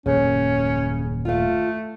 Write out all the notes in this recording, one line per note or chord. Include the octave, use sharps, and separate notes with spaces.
D#1 F#2 C#3 C#4
A3 F4 F5